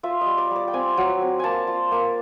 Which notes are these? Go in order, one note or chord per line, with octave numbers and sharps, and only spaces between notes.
F4 E5
D#5
G3
D5
G3
D5
G5
C4 G#5
F#3
C4
A#3 G#5 A5
F4
A#3